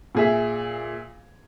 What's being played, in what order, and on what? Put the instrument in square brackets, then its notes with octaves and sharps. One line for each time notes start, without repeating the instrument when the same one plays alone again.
[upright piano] A#2 G#4 E5